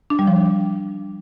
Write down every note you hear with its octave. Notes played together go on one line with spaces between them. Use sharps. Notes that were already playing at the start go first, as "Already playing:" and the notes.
D4
G3
F3